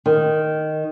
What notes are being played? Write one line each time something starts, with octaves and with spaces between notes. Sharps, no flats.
D#3